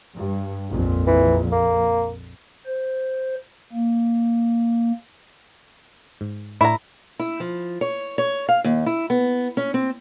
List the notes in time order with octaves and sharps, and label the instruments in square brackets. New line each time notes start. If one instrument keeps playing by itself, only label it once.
[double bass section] G2
A#1 F2 A#2
[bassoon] E3
A#3
[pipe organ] C5
A#3
[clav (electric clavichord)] G#2
[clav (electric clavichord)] A2 D4 C#5 [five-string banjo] E4 A#5
[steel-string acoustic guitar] E4
F3
C#5
C#5
F5
D#2
E4
B3
C#4
C4